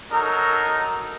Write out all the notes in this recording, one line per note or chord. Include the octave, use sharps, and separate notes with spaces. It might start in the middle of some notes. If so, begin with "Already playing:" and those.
F#3 D#4 A4 A#4